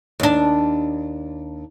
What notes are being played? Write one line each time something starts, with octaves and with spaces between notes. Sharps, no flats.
D#2 D4